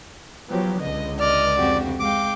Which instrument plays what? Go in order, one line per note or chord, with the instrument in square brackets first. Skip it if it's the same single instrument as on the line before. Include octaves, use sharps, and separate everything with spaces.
[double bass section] F3 F#3 B3 [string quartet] G4
[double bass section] C#2 D3 [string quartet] D#5
[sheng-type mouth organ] D5 [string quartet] D#5 F6
[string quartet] F2 F#4 G4
[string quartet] G#3 F5 G5 [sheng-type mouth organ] D6